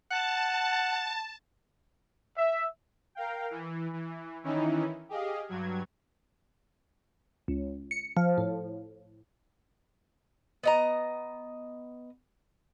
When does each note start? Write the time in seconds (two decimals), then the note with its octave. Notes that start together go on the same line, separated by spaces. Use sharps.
0.11 F#5 A5
2.38 E5
3.15 A#4 F5 G5
3.51 E3
3.93 E3
4.43 D#3 E3 C#4 D#4 E4
5.09 G4 G#4 D#5 F5
5.48 G2 F#3 G#6
7.48 C#2
7.91 C#7
8.17 F3
8.38 A2
10.63 B3 D#5 A#5